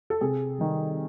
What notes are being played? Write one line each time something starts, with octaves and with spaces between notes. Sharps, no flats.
A4
C3 G#4
D#3 G3